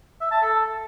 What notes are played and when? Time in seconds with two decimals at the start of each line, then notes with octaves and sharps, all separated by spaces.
0.20 E5
0.31 A5
0.42 A4